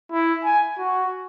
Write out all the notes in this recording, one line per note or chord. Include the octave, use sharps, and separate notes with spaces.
E4
G#5
F#4